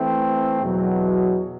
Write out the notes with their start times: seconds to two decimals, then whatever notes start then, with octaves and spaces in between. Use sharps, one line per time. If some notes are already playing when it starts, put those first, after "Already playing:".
Already playing: E3 A3 C4
0.61 E2 B2 F#3